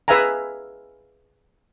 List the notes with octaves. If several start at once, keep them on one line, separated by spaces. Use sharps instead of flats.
G#4 B4 E5 F5 G#5 A#5